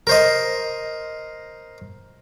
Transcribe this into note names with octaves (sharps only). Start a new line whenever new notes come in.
A#4 C5 D#5